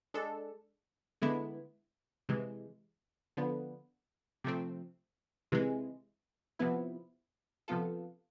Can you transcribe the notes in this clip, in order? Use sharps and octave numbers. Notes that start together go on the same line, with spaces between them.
G#3 D4 A4
D3 G#3 B3 E4
C3 E3 G#3
D3 F3 B3
C3 F3 A3 C4
C3 E3 G#3
C3 F3 B3 E4
C3 F3 B3 F4 A4